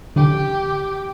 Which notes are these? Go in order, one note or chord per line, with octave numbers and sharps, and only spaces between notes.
D3 G4